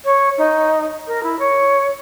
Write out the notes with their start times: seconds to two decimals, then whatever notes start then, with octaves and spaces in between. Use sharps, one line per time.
0.04 C#5
0.38 D#4
1.07 A#4
1.23 E4
1.39 C#5